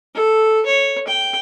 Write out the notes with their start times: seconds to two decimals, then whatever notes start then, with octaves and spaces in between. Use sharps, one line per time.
0.15 A4
0.66 C#5
1.07 G5